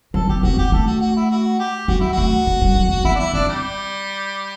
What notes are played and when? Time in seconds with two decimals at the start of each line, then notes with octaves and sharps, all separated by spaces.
0.14 F#3 A4
0.29 B3 G4
0.43 C4 F#4
0.57 B3 G4
0.72 A3 A4
0.86 F#4
1.01 F#4
1.16 E4
1.30 F#4
1.59 G4
1.88 F#3 F#4
2.00 E4
2.12 F#4
2.18 A3
2.47 A3
2.61 G3
2.76 F#3
2.90 E3
3.05 B3 E4
3.15 D4
3.19 E4
3.34 C4 D4
3.49 G3